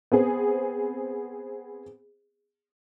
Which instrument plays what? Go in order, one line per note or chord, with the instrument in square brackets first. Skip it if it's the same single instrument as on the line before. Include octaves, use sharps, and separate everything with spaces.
[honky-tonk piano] B3 C4 G#4